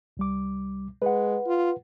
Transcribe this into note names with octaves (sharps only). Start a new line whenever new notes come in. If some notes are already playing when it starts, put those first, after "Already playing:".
C2 G3 D6
G#3 B4 F#5
F4